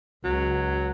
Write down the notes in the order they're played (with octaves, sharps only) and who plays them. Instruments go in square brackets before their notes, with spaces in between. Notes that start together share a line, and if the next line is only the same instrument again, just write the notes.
[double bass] C#2 [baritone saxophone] F#3